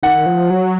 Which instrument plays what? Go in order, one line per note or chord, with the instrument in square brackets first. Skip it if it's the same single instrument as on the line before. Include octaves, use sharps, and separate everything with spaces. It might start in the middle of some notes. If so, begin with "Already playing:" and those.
[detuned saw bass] D#3 [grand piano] F#5
[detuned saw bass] F3
F#3